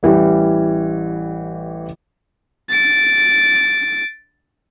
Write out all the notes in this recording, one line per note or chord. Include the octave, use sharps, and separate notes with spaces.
A1 E3 G3
A6 D7